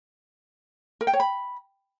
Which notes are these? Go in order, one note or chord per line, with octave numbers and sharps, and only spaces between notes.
A#4
G5
C#5
B5